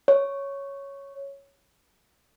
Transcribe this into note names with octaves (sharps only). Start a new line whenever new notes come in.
C#5